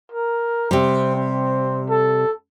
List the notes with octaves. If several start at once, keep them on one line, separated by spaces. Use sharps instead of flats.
A#4
C3 G3 C4
C4
A4